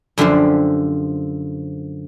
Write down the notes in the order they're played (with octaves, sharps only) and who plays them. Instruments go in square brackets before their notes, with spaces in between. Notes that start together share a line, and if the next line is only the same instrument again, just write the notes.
[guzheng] F#2 D3 F3 G4 C5